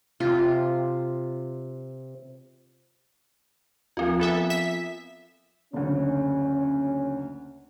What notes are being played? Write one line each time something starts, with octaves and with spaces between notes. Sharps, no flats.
C3 F4
D#2 F3 C4 F4
B3 A4 E5
E5 B6
F#1 D2 C#4